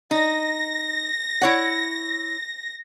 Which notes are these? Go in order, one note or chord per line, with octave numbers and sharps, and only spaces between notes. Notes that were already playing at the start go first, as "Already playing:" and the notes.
D#4 A#6
E4 C#5 F#5